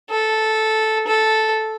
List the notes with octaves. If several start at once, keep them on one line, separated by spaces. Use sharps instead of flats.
A4
A4